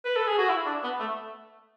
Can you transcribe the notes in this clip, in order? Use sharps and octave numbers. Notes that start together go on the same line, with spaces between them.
B4
A4
G#4
F#4
E4
D4
B3
A3